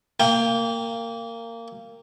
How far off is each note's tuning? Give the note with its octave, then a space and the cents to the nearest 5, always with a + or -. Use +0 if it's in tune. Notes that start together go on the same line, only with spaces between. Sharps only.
A#3 -20 G5 +15